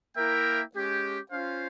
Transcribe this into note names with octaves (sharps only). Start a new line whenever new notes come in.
A#3 E4 A#4 E5 G5
G#3 C#4 G4
C#4 F4 C5 F5